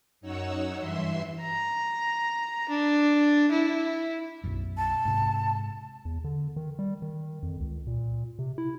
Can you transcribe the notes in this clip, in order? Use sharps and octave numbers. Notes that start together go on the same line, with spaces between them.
F#2 D#4 C#5 F#5 E6
G2 E3 E5 C6
A#5
D4
E4
B1 F#2
A5
G#2 C3
E2
D3
D#3
G3
D#3
F2
C#2
A#2
C3
E4